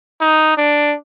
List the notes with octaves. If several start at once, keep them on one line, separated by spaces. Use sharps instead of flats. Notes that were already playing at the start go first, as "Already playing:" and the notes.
D#4
D4